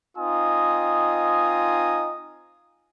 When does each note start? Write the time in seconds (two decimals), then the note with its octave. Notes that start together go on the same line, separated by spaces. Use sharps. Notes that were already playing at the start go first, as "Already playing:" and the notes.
0.17 C4 D#4 F4 D#5 G#5 D#6